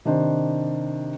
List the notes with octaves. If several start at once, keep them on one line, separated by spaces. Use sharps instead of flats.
C3 D#3 D4 C5